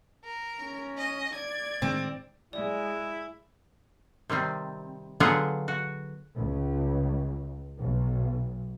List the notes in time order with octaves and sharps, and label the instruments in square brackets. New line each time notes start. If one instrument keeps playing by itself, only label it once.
[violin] A#4
[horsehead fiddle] C#4
[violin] D#5
[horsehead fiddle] D5 [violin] G#6
[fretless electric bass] A2 D#3 G#3 [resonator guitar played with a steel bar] C4
[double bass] G#3 [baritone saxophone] E4 [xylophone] D5
[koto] C3 D#3 G3 C4
D3 F#3 B3 F4 G#4 F#5
F#4
[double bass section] C#2
B1